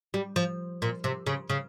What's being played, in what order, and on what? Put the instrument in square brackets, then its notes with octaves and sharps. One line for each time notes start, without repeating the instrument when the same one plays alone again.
[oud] G3
F3
A#2
C3
C#3
C#3